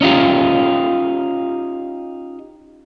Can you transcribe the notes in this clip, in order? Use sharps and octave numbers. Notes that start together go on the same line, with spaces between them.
C#4 D#4 F4 G4